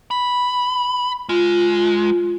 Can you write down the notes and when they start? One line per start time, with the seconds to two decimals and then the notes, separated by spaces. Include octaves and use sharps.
0.11 B5
1.29 G#3 F4